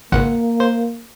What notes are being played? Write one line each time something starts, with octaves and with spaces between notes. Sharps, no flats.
G#1 C#2 A#3 F#5
C5